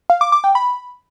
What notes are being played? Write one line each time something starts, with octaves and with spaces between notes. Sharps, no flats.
F5
D6
D6
G5
B5